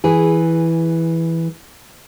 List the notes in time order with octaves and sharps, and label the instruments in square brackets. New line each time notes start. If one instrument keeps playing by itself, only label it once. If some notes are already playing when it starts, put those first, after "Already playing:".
[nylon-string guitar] E3 E4 G#4